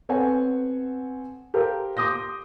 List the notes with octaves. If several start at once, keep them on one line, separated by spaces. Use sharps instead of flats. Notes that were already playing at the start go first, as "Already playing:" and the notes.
B3 C4 A4 C#5 F#5 G#5
G4 A4 A#4 C5 F5
C6 D6 D#6 G6 A#6